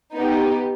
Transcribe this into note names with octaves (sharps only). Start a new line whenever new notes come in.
B3 D#4 G4